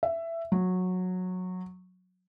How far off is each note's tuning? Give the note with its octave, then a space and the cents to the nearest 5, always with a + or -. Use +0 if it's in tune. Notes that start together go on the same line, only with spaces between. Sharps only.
E5 +15
F#3 -15